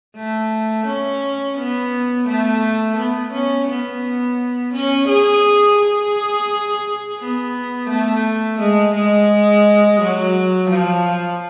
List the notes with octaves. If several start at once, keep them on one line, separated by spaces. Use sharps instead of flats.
A3
C#4
B3
A3
B3
C#4
B3
C#4
G#4
G#4
B3
A3
G#3
G#3
F#3
F3